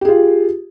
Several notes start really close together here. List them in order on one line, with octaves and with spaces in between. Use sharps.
G4 G#4 F4